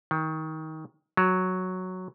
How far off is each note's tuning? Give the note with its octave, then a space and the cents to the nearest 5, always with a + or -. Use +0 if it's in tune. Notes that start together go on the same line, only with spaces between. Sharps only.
D#3 +25
F#3 +0